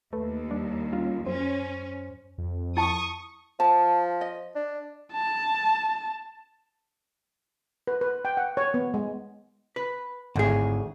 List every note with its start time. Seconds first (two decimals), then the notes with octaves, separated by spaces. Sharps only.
0.13 D#2 A3 B4
0.51 G3 D4
0.93 G3 C#4 F4
1.27 F#2 C#4 C5
2.38 F2
2.77 E4 A5 C#6 D#6
3.60 F3 A5
4.21 D#5
4.55 D4
5.13 A5
7.87 B4
8.01 B4
8.25 G5
8.37 F#5
8.57 C#5
8.74 B3
8.94 G#3
9.76 B4
10.36 G#1 D2 A2 G#4